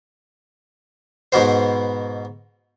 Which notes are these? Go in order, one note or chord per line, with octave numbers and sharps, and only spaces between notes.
G#2 B2 B3 C5